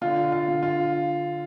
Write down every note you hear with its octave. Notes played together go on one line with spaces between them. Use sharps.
D3 F4
F4
D3
F4